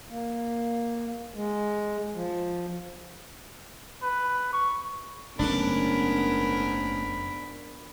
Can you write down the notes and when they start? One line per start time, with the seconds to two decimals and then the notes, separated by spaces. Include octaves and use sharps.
0.10 A#3
1.34 G#3
2.14 F3
4.02 B4
4.53 C#6
5.39 F#1 G#2 A3 B3 C#4 D4 A#4 B5